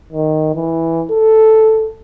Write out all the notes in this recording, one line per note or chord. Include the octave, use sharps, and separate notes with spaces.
D#3
E3
A4